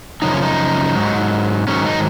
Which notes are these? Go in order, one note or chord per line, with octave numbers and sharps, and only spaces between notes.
F#2 C#3 F3 D#4
C#4
D#4
G#2 F#3
G#2 D#3 F#3 C#4
D#4